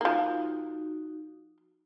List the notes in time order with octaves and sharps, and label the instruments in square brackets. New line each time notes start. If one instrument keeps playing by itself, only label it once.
[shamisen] F3 A#3 [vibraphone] D#4 F#4